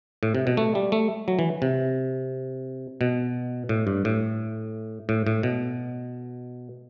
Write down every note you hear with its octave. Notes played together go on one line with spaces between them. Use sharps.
A2
C3
B2
A3
G3
A3
F#3
E3
C3
B2
A2
G2
A2
A2
A2
B2